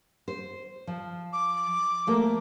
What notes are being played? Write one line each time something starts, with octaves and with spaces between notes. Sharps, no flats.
C5
F3
D6
F3 A3 A#3